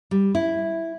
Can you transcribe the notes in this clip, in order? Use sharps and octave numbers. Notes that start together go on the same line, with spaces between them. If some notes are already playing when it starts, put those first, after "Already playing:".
G3
E4